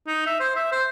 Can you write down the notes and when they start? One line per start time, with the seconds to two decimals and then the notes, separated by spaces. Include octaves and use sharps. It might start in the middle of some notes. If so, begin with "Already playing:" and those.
0.07 D#4
0.26 E5
0.40 C5
0.56 E5
0.72 C5